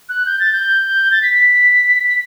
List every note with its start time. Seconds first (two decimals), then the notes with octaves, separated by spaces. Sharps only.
0.09 F#6
0.26 G6
0.40 A6
0.53 G6
1.12 A6
1.22 B6
1.34 B6
2.08 B6